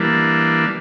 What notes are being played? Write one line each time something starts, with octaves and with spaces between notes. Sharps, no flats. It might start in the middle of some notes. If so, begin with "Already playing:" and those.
Already playing: E3 G3 A#3 D4